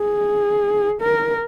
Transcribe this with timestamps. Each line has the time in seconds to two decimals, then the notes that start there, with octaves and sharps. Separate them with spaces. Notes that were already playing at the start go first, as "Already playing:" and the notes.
Already playing: G#4
1.01 A#4